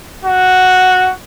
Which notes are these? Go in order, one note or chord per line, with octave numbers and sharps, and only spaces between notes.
F#4